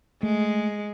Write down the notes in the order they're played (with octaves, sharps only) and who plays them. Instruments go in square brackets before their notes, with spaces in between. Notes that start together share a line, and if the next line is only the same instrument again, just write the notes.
[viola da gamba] G#3 [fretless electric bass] A3